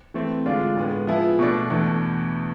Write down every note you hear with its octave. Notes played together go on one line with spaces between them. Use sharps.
E3 A3 C4
D3 G#3 D4 F4
A2 G#3 B3
F3 B3 E4 G#4
B2 A3 D4
E2 B2 A3 D4